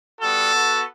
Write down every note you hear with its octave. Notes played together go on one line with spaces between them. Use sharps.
G3 B3 F#4 A4
B3 F#4